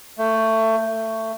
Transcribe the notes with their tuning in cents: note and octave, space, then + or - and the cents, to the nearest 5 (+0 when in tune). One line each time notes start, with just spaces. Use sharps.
A3 +20
A3 +20